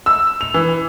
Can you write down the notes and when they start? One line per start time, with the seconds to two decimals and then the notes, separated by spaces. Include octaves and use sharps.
0.06 E6
0.41 F7
0.54 E3